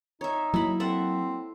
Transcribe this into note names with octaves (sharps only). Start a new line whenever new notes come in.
D#4 C#5 E5
F#3 A#3 E4 B5
C4 A4 E5 F#5